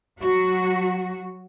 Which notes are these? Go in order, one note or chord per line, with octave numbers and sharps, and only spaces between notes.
F#3 F#4